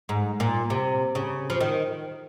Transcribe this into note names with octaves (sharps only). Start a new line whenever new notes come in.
G#2
A#2
C3
C#3
F3
D#3